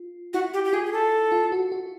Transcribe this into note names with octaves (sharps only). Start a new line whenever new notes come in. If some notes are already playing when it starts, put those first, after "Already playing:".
Already playing: F4
E4 F#4
G4
G4
F4 G#4
G#4
A4
F4
F#4
F#4